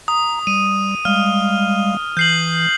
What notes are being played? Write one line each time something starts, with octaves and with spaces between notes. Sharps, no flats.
A#5 D#6
G3 D#7
G3 G#3 F5 F6
E3 G6 C7 F#7